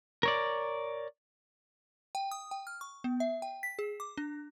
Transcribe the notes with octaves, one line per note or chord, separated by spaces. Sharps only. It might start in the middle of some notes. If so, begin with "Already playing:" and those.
A#4 C#5 D5
G5
D#6
G5
F6
C#6
B3
E5
G5
B6
G#4
D6
D4